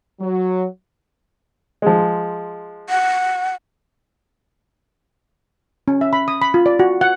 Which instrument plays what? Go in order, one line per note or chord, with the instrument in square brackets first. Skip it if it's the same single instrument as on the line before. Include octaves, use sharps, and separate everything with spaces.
[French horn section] F#3
[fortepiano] F3 G#3
[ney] F#5
[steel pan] C#4
E5
B5
D#6
B5
F4
D5
F#4
F#5